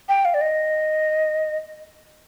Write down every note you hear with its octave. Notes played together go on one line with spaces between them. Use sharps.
G5
F5
D5
D#5